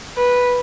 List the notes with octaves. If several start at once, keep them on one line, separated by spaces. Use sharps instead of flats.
B4